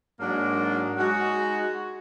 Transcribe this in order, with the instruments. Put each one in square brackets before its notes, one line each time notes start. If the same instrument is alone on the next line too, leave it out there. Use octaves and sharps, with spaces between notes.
[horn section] G#2 F#3 A#3 D4
G#3 D#4 F#4